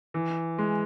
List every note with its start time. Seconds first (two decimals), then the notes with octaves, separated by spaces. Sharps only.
0.14 E3
0.58 G#3